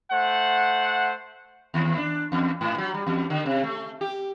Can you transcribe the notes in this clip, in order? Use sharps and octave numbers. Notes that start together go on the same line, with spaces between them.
A3 C5 F#5
D#2
D4
E2
G#2
F#3
G3
E2
D3
C3
A3
G4